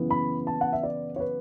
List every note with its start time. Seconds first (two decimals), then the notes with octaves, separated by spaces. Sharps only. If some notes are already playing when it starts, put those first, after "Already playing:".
Already playing: F#2 C#3 E3 B3
0.10 B5
0.47 A5
0.61 F#5
0.73 E5
0.83 D5
1.16 C#5
1.20 B4